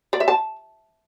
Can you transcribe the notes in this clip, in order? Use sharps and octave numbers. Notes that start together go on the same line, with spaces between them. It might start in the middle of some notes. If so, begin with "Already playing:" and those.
D5
E5
A5